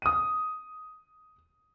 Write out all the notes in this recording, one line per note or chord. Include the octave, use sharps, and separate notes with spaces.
D#6 D#7